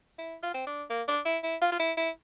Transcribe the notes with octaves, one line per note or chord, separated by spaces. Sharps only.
E4
F4
C4
D4
A#3
D4
E4
E4
F4
F4
E4
E4